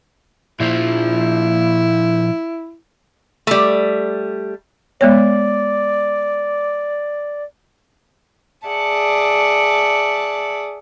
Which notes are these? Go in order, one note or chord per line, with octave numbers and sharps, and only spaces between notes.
A#2 F3 E4
G3 A3
G#3 B3 C#5 D5
G#4 D5 E5 F#5 A5